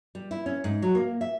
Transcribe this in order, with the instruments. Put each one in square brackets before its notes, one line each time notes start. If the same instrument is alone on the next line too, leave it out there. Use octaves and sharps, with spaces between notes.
[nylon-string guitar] G3
E4
C#4
G#2
F#3
A#3
E5